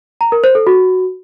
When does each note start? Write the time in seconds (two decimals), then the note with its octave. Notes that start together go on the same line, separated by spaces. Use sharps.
0.21 A#5
0.32 A#4
0.44 C5
0.55 A4
0.67 F#4